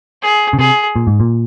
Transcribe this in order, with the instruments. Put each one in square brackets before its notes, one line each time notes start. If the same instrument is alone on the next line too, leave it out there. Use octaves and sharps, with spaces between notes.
[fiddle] G#4
[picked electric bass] C#3
[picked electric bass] C3 [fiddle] G#4
[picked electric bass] A#2
G#2
A#2